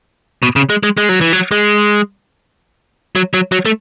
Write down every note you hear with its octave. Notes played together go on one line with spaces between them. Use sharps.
B2
C#3
G#3
G#3
G#3
F#3
E3
F#3
G#3
F#3
F#3
F#3
A3